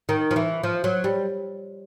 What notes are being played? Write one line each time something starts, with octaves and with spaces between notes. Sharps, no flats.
D#3
F3
E3
F3
F#3
G3